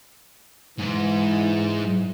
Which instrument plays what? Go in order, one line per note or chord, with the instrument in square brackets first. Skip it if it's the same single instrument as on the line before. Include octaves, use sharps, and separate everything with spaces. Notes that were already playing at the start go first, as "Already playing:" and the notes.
[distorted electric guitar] G#2 [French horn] E3